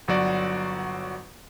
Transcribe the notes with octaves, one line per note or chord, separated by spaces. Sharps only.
G1 F#3 F#4 D5